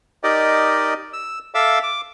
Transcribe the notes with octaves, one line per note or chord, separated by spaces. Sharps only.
D#4 G4 A#4 D5 D#5
E6
A4 E5 F5 D6 E6
D6